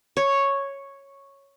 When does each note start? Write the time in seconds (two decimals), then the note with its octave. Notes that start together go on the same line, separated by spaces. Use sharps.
0.17 C#5